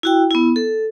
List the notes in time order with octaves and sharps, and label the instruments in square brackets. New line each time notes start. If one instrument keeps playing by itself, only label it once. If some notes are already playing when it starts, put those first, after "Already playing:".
[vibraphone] E4 F#4 G5
B3 E4
A4